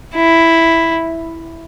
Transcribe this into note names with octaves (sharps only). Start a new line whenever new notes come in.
E4